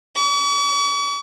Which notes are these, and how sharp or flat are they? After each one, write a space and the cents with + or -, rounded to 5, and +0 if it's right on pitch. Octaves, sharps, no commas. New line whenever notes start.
C#6 +45